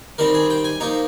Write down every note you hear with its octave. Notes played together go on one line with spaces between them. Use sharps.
D#3 G3 C4 A#4
G#4
G5
G#5
F3 A#3 D#4 A#5